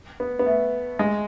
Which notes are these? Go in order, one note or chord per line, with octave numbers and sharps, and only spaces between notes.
B3
B3
A3
G#3